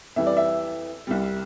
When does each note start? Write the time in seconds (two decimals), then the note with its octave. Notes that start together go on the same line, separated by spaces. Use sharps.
0.16 F2 E3 G3 E5
0.26 D5
0.37 E5
1.07 C2 C3 G3